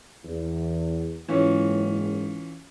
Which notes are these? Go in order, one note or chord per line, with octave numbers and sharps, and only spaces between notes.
E2
F#1 G#2 E3 C#4 F4